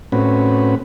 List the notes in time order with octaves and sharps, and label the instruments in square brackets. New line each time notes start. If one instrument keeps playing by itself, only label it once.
[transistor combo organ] A2 C4 C#4 F#4 B4